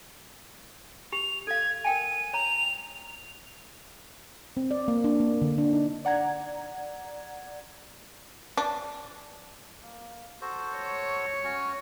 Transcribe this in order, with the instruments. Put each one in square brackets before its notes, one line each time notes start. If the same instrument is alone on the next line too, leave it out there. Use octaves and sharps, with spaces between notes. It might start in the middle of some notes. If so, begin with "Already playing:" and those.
[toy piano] G4 [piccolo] F7
[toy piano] A4 F5 [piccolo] G#6
[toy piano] A#4 G5 G#5 [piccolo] D#7
[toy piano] C#5 A#5 [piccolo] F7
[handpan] C4
D5
A#3
D4
A#3
D3
D4
D#4
[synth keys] D5 F#5 A#5 G#6
[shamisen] D4
[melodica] A#3
F#4 A4 C5
[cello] C#5
[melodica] C#4 F#4 G#5